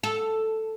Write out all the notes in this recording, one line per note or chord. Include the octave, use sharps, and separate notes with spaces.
A4